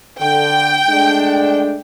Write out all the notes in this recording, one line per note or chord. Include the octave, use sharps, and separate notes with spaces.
D3 G5
G#3 A3 D4